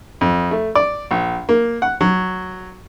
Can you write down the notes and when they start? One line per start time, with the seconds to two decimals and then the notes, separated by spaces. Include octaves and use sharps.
0.21 F2
0.51 A3
0.75 D5
1.11 A#1
1.49 A#3
1.82 F#5
2.01 F#3